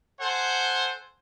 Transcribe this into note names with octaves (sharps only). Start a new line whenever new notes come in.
A4 C5 F#5 G#5